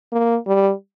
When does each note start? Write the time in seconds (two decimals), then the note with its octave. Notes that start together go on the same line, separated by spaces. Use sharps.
0.12 A#3
0.47 G3